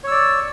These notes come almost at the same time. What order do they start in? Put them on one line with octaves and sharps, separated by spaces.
C#5 E6 D5